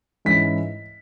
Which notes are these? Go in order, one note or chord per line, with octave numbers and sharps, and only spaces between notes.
G#2 E3 C#4 E4 B6